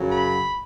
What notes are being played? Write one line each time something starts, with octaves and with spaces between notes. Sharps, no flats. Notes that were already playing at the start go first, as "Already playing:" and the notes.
Already playing: F#2 C#3 F#3
B5